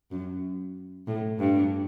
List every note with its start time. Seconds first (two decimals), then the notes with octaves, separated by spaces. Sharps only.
0.11 F#2
1.07 A2
1.39 G2